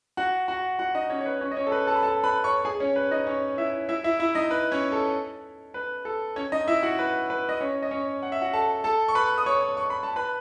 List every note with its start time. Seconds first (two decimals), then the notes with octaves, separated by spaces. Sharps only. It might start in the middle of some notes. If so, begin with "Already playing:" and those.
0.17 F#4 F#5
0.48 F#4 F#5
0.79 F#4 F#5
0.95 D#4 D#5
1.10 C#4 C#5
1.21 C#5
1.26 B4
1.41 C#4 C#5
1.51 D#5
1.56 C#4 C#5
1.67 A4
1.72 B4
1.87 A4 A5
1.96 B5
2.03 A4 A5
2.24 B4 B5
2.44 C#5 C#6
2.65 G#4 G#5
2.80 C#4 C#5
2.96 B4
3.11 D#4 D#5
3.26 C#4 C#5
3.58 E4 E5
3.89 E4 E5
4.04 E4 E5
4.20 E4 E5
4.35 D#4 D#5
4.51 B4
4.72 C#4 C#5
4.92 A4
5.74 B4
6.05 A4
6.36 C#4 C#5
6.52 D#4 D#5
6.68 E4 E5
6.83 F#4 F#5
6.99 B4
7.30 B4
7.49 D#5
7.60 C#4 C#5
7.82 D#5
7.91 C#4 C#5
8.22 F#5
8.32 E5
8.42 F#4 F#5
8.53 A4 A5
8.84 A4 A5
9.08 C#6
9.15 B4 B5
9.38 D#6
9.46 C#5 C#6
9.77 C#6
9.90 B5
10.03 A5
10.16 B4 B5